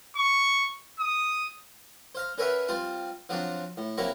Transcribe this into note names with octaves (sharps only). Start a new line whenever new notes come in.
C#6
D#6
C5 F5 A#5
C#4 A#4 B4 C#5 E5 F#5
G3 C4 F4 F5
F3 F#3 C4 D4 F#4
A2
C3 F#3 A#3 E4 A#5 C#6